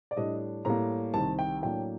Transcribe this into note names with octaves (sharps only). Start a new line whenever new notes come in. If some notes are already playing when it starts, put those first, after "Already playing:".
D5
A2 G3 D4 D#5
A2 G3 A#3 A#5
C2 C3 D#3 A5
G5
A2 F#3 A#3 D4 G5